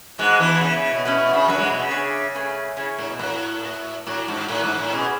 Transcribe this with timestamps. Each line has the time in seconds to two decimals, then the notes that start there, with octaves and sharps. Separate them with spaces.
0.18 G#2 G#3 F#4 B4 F#5 A5
0.39 E2 E3
0.61 C#3 B3 E4 B4
0.76 C#3
0.91 B2
1.05 B2 C#4 E4 B4
1.18 B2
1.33 C#3
1.48 F#2 F#3 F#4 B4 E5
1.58 G#2 G#3
1.70 B2
1.80 C#3
1.91 D4 G#4 C#5 E5
2.34 A3 C#4 G#4 B4
2.77 C#3 C#4 E4 G#4 C#5
2.98 A2
3.10 B2
3.19 A2 F#4 B4 D5 F#5
3.63 F#4 B4 E5 A5
4.06 A2 D4 F#4 C#5
4.28 G#2
4.48 A2 E4 B4 F#5
4.64 G#2
4.78 A2
4.92 B2 C#4 G#4 D5